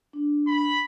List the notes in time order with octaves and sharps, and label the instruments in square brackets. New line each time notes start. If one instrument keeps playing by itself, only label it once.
[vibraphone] D4
[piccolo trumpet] B5